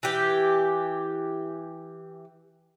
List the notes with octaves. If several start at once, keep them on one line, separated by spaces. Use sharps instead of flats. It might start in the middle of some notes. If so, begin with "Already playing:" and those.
E3 G4